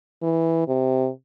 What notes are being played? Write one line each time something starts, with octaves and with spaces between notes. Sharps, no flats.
E3
C3